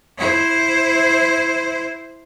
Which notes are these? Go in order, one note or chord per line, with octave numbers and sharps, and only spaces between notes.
E4 C5